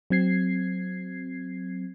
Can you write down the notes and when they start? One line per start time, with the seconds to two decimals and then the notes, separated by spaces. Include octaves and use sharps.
0.10 F#3 C4 G#6 C7